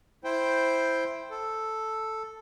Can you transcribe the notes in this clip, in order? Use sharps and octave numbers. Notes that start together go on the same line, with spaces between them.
E4 C5 G5
A4